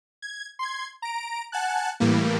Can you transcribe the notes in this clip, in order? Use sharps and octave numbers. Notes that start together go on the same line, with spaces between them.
G#6
C6 G#6
A#5 D7
F#5 G#5 A5 F#6
A2 E3 G3 A#3